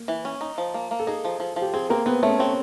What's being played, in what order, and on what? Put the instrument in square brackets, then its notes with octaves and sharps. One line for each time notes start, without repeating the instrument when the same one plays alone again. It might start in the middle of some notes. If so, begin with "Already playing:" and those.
Already playing: [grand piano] A#3
[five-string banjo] E3
C#4
D#4
F3
A#3
A#3
[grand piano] A4
[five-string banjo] D#4 [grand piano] G#4
[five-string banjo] F3
F3
F3
[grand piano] G4
[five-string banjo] C4 [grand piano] G#4
[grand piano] A#3 A#4 [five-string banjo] C4
[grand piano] B3 B4 [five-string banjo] C4
[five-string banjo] A3 [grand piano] C#4 C#5
[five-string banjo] C4 [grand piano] C#4 C#5